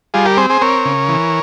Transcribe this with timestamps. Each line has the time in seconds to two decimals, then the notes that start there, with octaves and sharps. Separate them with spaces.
0.14 G3 F4 G#4
0.26 G4 A#4
0.37 C4 G#4 C5
0.50 G#4 C5
0.61 C4 A#4 C#5
0.85 C#3
1.09 E3